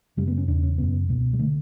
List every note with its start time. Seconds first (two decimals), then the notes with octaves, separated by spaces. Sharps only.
0.17 F#2 C#3 G3
0.28 B3
0.38 C#4
0.48 E2 C#3 D4
0.63 C#4
0.78 F#2 C#3 B3
1.09 C#2 B2
1.33 G3
1.39 D3 A3